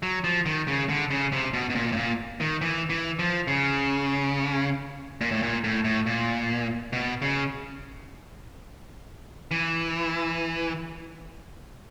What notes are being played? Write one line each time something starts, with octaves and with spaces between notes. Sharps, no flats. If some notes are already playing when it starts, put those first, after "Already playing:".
F#3
F3
D#3
C#3
D3
C#3
C3
B2
B2
A#2
A2
A#2
D#3
E3
E3
F3
C#3
A#2
A2
A#2
A2
A2
A#2
B2
C#3
E3